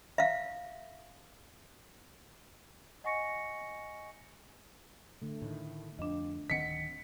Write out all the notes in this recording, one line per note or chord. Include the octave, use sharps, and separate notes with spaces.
E5 F5
D#5 F#5 G#5 C#6 A#6 C#7
D3 A3
A2 D#3
F2 D4 D#5
D1 D#3 C4 D#5 F#5 B6 C#7